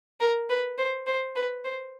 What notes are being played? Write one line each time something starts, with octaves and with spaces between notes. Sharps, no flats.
A#4
B4
C5
C5
B4
C5